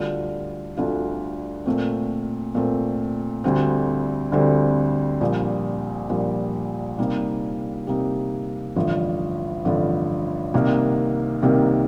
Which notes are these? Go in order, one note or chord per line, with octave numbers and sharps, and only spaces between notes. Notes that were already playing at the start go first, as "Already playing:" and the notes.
Already playing: D2 D3 G3 D4 F4
D2 D3 G3 D4 F4
A#2 A3 C4
A#2 A3 C4
D2 D3 G3 C4
D2 D3 G3 C4
A#1 A#2 G3
A#1 A#2 G3
C3 G3 A#3 D#4
C3 G3 A#3 D#4
A1 G2 D3 F3
A1 G2 D3 F3
C2 C3 D#3 A#3
C2 C3 D#3 A#3